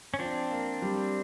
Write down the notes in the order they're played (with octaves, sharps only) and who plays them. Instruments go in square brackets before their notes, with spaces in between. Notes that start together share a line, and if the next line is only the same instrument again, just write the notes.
[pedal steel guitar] C#4
[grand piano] F3 [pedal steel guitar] C4 D4
[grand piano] A#3
G3